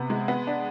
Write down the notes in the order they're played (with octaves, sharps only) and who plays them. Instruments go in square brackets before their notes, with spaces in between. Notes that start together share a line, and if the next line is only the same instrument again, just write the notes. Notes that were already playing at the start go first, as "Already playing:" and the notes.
Already playing: [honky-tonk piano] C3 B3
G#3
B3
D4